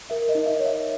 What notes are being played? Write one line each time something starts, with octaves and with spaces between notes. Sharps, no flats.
A#4 E5
D#5
D#4
E5
C#5
E5